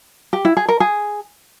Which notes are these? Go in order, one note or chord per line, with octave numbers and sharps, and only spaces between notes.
G4
E4
G#4
A#4
G#4